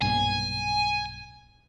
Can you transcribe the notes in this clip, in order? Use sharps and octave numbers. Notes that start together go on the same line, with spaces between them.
B1 G2 A#2 G#5